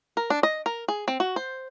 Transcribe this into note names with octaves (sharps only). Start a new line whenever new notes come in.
A#4
D4
D#5
A#4
G#4
C4
F#4
C5